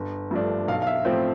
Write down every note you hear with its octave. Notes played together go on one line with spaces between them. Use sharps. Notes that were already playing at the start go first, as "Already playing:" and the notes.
Already playing: G1
G2 F3 A3 D4
B1 F5
F5
E5
A2 F3 C4 C5